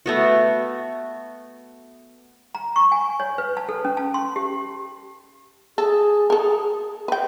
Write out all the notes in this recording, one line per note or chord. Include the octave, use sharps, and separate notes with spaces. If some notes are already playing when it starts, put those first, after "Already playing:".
A3 B3 F#4
A#5
C#6
G#5
C#5
B4
A5
A4
C#4
A5
C6
G4
G#4 A4
A4 A#4
B4 G5